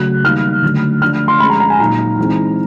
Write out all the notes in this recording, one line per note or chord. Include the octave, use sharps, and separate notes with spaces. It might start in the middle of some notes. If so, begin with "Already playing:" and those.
Already playing: C#3 F#3 A3 F#6
D#3 G3 A#3 D#4 F6
D3 F#3 A3
F3 A3 D4 F6
C6
F3 G#3 C#4 B5
A#5
A#5
G#5
A#2 F#3 A#3 D#4 A#5
E3 G#3 C4 D#4